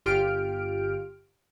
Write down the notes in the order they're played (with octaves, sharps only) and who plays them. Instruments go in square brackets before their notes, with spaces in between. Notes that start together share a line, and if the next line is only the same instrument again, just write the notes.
[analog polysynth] G1 F4 G4 F6 D7